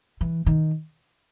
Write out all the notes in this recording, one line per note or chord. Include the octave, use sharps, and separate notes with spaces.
E3
D#3